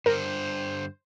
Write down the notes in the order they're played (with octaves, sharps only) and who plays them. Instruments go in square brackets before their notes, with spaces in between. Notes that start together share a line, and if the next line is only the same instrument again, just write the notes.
[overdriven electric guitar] G2 D3 [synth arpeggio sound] A#4 [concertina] C5